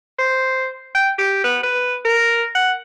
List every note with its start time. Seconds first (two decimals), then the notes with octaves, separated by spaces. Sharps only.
0.19 C5
0.95 G5
1.19 G4
1.44 B3
1.63 B4
2.05 A#4
2.55 F#5